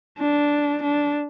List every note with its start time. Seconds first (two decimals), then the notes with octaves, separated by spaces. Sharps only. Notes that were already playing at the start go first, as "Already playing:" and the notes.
0.19 D4
0.82 D4